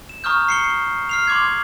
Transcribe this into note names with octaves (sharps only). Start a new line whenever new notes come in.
E7
A#5 C#6 D#6 F6 G6
C7 C#7 G7
F6 C7 F7
C6 D6 G#6